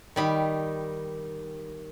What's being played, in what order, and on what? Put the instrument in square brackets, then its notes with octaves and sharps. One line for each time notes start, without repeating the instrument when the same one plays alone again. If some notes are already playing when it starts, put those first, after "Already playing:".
[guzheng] D#3 G3 D#4 B5